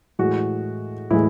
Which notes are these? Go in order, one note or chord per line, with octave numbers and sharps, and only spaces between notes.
A2 E3 G#3 F#4
A2 E3 G#3 E4